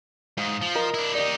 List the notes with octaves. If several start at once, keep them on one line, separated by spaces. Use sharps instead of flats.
G#2 F5 D#6
F3
A#4 D#5
D4 E4
D#4 G4 D5 D#5